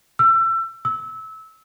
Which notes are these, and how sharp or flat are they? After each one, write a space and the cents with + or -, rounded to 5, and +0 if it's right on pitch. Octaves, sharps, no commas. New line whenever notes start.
E6 +30
E6 -20